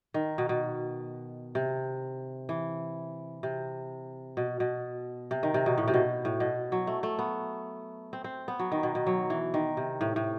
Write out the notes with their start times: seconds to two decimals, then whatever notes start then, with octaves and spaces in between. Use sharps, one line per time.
0.14 D#3
0.38 B2
0.49 B2
1.55 C3
2.49 E3
3.43 C3
4.37 B2
4.60 B2
5.31 C3
5.43 D#3
5.54 C3
5.66 B2
5.78 A2
5.88 C3
5.94 B2
6.25 A2
6.40 B2
6.72 F#3
6.87 A3
7.03 A3
7.19 B3
8.13 C4
8.24 C4
8.48 B3
8.59 F#3
8.72 D#3
8.83 B2
8.95 B2
9.07 F#3
9.30 E3
9.54 D#3
9.77 C3
10.01 A2
10.16 A2